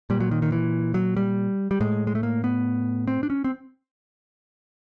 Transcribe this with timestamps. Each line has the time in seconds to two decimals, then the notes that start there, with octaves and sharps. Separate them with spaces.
0.10 A#2 G3
0.20 F#3
0.31 D#3
0.42 D#3
0.52 E3
0.94 F#3
1.17 G3
1.71 G3
1.80 A2 G#3
2.07 G#3
2.15 A3
2.23 A#3
2.44 B3
3.07 C4
3.23 D4
3.30 C#4
3.44 C4